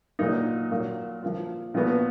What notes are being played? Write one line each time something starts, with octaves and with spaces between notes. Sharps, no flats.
A#2 F#3 A#3 D#4
A#2 F#3 A#3 F4
F3 A#3 F4
A#2 F3 B3 F#4